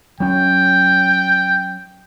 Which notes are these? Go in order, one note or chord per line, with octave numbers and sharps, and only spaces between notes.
F#3 C#4 G5